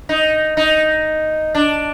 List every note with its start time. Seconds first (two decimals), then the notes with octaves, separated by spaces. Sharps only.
0.09 D#4
0.57 D#4
1.55 D4